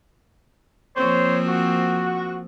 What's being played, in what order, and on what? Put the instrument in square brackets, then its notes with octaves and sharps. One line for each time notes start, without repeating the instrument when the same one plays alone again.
[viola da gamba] F3 A#3 C4 [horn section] C5 C#5
[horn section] F#4